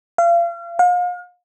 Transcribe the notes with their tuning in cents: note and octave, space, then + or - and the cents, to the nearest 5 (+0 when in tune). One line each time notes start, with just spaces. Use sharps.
F5 -35
F5 +40